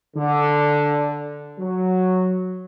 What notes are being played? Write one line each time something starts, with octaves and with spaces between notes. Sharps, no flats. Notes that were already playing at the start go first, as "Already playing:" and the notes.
D3
F#3